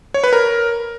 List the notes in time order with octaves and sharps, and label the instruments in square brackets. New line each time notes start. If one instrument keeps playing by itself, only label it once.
[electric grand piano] C#5
B4
A#4